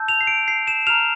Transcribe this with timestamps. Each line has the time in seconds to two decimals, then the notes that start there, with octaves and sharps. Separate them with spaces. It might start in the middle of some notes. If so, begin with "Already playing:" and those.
Already playing: A5 E6 G6
0.08 F7
0.21 C7
0.27 D7
0.48 C7
0.67 E7
0.87 A#5 F6 F7